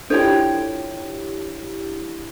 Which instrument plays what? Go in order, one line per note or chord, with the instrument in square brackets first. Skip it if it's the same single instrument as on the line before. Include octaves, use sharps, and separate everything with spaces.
[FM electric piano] D4 E4 G4 [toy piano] F4 A4 [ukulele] C5 C#5 G5